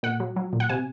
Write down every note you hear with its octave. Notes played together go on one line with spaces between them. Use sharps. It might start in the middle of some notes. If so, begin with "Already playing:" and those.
A#2 F#5
F#3
F#3
A#2
F#5
C3 G#5